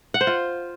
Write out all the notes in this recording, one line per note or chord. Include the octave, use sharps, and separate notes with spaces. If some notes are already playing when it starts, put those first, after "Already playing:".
F#5
C5
F4